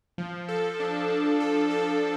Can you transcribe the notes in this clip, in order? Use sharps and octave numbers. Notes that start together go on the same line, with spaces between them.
F3
A4
D4
D4
A4
A4